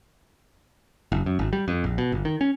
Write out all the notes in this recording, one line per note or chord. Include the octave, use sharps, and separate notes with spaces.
F#1
F#2
G#1
G3
F2
A#1
B2
G1
D#3
C#4